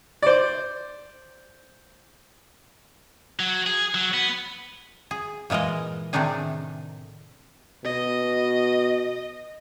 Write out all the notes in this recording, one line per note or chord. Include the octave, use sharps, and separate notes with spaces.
C5 D5
F#3
G#4
F#3
B3
G#4
A#2 E3 G#3 A#4 D#5
A2 C3 D#3 D4 D#4 G#4
B2 D#5